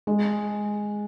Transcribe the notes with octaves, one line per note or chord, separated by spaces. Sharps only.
G#3